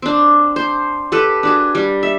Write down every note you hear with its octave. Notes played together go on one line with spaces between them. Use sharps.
C4 D4
C5
G4 A4 B4
D4 F#4 G#4
G3
E5